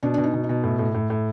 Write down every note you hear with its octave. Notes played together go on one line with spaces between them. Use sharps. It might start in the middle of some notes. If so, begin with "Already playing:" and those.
B2 D4
B2 D4
D#4
B2
D#4
B2
A2
A2
A2
A2